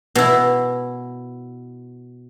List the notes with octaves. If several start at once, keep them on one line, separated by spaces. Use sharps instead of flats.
B2 E4